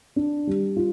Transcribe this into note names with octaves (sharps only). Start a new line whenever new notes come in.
D4
G3
F4